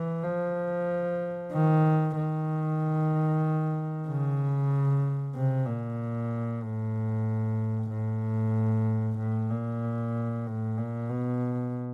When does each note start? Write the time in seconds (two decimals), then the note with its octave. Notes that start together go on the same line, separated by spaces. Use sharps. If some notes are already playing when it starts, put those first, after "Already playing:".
Already playing: E3
0.24 F3
1.52 D#3
2.16 D#3
4.08 C#3
5.35 C3
5.66 A#2
6.63 A2
7.90 A2
9.18 A2
9.50 A#2
10.46 A2
10.78 A#2
11.10 B2